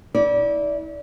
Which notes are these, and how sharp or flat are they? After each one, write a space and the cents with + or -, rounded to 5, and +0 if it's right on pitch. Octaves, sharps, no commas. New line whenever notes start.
E4 -40 D5 -15